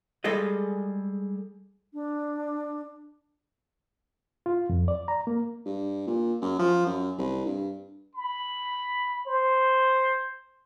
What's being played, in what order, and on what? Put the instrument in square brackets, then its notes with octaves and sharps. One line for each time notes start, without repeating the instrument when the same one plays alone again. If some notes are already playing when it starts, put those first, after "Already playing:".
[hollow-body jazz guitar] G3 G#3 G#4 A4 D#5
[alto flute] D4
[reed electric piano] F4
F2
D5
A#5
A#3
[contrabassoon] G2
A#2
F#2
F3
F#2
C2
G2
[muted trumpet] B5
C5